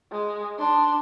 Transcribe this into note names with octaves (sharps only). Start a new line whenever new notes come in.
G#3
D4 C6